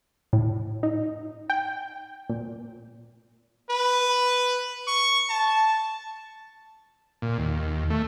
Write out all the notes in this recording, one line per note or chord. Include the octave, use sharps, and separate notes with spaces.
A2
D#4
G5
A#2
B4
C#6
A5
A#2
D#2
A3